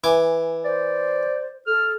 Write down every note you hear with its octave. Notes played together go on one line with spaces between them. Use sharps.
E3 G#5 D6
C5 D5
A4 F6